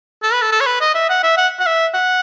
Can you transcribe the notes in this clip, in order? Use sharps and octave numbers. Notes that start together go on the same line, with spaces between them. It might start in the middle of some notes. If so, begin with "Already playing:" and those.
A4
B4
A4
A4
C#5
B4
D#5
E5
F#5
E5
F#5
F#5
E5
F#5